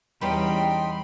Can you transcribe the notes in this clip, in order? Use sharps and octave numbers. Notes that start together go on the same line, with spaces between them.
E2 G3 B3 C#4 D#4 G5 B5 C6